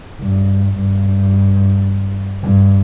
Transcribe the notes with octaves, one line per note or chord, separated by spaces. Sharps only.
G2
G2
G2